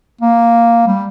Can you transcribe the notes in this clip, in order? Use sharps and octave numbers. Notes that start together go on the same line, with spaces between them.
A#3
G3